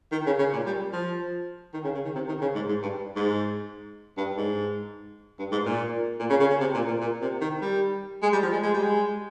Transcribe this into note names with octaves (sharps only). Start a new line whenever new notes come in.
D#3
C#3
C#3
A#2
G3
F3
D#3
C#3
C#3
D#3
C3
D#3
C#3
G#2
G#2
G2
G#2
G2
G#2
G2
G#2
A#2
A#2
C#3
C#3
C#3
C3
A#2
A#2
A#2
C3
D#3
G3
G#3
G3
F3
G#3
G#3
G3
G#3